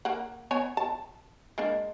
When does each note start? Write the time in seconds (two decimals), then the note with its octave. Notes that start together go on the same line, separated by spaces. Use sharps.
0.05 A#3 F#5
0.51 B3 C#5 G#5
0.77 A5
1.58 G#3 A#3 D4